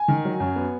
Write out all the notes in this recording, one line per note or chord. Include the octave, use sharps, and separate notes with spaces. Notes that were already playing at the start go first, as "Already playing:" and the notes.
Already playing: G#5
D#3
F#3
F#2
B3